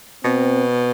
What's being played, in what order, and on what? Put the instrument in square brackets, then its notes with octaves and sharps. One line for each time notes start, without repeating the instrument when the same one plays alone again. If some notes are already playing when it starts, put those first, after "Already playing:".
[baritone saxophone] B2 [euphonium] C4